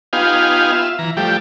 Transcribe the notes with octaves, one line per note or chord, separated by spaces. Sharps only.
B3 D#4 F4 G4 F5 G#5
F4 E5
E3 A#5
F3 G3 A3 G4